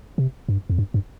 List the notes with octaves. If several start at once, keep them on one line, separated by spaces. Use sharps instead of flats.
C3
G2
F2
G2
G2